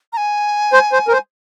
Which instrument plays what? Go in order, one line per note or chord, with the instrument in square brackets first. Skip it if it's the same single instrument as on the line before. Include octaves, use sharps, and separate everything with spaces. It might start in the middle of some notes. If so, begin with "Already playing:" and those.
[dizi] A#5
G#5
[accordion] C5
C5
A#4
C5